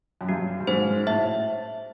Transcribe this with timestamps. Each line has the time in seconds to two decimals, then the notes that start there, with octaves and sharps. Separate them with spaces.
0.21 F#2
0.29 G2 F#4
0.60 G2
0.67 G#2 C5
1.06 A2 E5